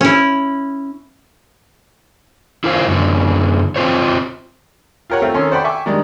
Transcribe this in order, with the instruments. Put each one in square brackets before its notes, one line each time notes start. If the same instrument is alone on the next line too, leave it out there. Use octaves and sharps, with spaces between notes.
[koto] C#4 E4
[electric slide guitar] E4 F4 A#4 C5 F5
F#2 D3
C4 F4 C5 C#5
[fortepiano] F4 G4 A#4 C#5 F#5
A3 C4 F4
D#3 C#4 A4 C#5 C6
C5 D5 F#5 G5 B5 C6
E5 G5 G#5 C#6 D6
D#3 G3 G#3 D4